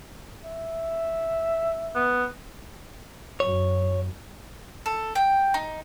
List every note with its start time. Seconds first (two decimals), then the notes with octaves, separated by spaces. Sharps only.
0.45 E5
1.95 B3
3.40 F#2 C#5
4.86 A4
5.15 G5
5.54 D#4